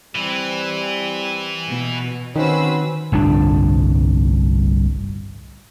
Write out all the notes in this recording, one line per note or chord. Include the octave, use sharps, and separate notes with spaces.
E3 G3 C4
B2
D#3 C4 C#4 F#4 B4 C5 E6
G1 C2 A2 D4